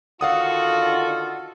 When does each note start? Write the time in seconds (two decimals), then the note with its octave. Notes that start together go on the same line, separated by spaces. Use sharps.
0.21 D3 D#3 F4 F#4 A4 F5 F#5 D#6